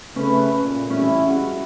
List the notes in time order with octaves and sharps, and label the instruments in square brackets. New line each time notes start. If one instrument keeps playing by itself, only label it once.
[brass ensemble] C#3 A3 B4 [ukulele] C#4
[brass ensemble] A#2
[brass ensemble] A1 G3 E4 [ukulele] C#4
[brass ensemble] G#3 F#4